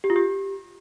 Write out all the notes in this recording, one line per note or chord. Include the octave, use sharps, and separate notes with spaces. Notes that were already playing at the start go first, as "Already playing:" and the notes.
G4
F4
G4